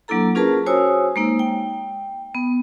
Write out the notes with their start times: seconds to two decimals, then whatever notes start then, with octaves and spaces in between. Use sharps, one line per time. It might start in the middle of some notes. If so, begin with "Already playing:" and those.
0.08 F#3 A#3 D4 E4 A4 A#5
0.35 C#4 F4 G#4 A#4 B4 A5
0.66 F#4 C5 C#5 G#5 D#6 E6
1.16 G#3 A#3 D#4
1.39 G5
2.35 B3